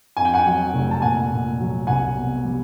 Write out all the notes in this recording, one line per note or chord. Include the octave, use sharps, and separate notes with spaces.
F2 G#5
G5
F#5 G#5
F#3
F1
A5
A#2 F#5 G#5
A#2
F#3
C2 F#5 G#5
B2
G3